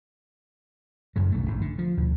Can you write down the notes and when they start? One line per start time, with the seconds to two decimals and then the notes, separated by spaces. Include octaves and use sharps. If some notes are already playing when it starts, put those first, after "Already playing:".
1.16 F#2 C#3 F#3
1.32 B1 F#2 A3
1.46 A1 G#2
1.61 D3
1.78 F3
1.97 D2 B2